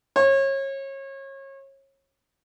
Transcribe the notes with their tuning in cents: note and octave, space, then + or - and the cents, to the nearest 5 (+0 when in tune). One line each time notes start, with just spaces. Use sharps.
C#5 -30